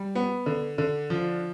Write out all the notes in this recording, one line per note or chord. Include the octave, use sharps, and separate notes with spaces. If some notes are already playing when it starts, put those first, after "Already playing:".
Already playing: G3
B3
D3
D3
F3